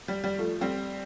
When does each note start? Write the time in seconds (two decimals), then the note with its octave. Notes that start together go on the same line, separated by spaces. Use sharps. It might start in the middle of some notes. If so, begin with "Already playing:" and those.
0.08 G3
0.24 G3
0.38 F3 A3
0.61 G3 C4